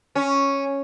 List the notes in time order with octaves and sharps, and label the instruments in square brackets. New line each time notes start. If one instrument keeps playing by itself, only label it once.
[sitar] C#4